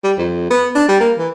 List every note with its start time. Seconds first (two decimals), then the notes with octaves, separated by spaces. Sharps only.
0.04 G3
0.18 F2
0.50 B3
0.75 D4
0.88 G3
1.00 A#3
1.18 E3